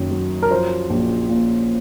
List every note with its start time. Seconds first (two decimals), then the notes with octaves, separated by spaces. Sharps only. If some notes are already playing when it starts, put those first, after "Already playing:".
Already playing: F#1 F#2 D#3
0.11 F#3
0.42 A#4
0.51 F3 C5
0.90 A#1
1.29 A#2